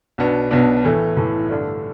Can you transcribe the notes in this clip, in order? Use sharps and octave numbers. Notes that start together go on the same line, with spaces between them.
B1 B2 B3 D4
B1 B2 B3 D4
A2 E3 A3
A2 E3 A3
G2 D3 A3 D4